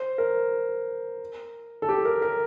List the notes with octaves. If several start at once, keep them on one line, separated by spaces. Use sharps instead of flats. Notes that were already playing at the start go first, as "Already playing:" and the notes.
Already playing: C5
A#4
A4
G4
A#4
A#4